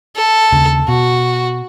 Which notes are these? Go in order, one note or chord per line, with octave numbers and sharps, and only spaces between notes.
A4
D#2 C#3
B2 F#4